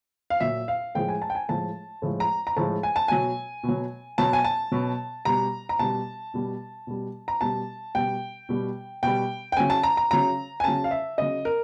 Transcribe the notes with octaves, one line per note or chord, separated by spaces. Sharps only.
F5
A#2 F#3 E5
F5
A2 F3 G#3 G5
G#5
A5
G5
G#5
A2 F3 G#3 A5
A2 F3 G#3
A#5
A#5
A2 F3 G#3 A5
G#5
A5
B2 F#3 G#5
B2
F#3
B2 F#3 A5
G#5
A5
B2 F#3
B2 G3 A#5
A#5
B2 G3 A5
B2 G3
B2 G3
A#5
B2 G3 A5
B2 G3 G5
B2 G3
B2 G3 G5
G5
C#3 F#3 G#5
A5
A#5
A#5
C#3 F#3 A#5
G#5
C#3 F#3 A5
F5
E5
C#3 F#3 D#5
A#4